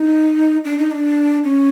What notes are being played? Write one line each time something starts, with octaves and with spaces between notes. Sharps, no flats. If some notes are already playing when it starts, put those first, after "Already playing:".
Already playing: D#4
D4
D#4
D4
C#4